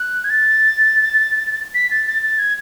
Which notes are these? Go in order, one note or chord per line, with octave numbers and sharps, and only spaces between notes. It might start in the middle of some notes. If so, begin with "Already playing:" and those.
Already playing: F#6
G#6
A6
B6
A6
A6
A6
G#6